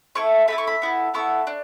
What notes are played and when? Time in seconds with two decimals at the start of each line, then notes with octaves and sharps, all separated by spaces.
0.15 A3 E4 A4 C#6
0.48 A3 E4 A4 B5
0.58 C#6
0.67 B5
0.82 B3 E4 A4
1.14 B3 E4 A4 C#6
1.47 D4